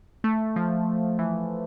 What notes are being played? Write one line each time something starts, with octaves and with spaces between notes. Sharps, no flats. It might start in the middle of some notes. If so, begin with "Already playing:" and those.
A3
F3
E3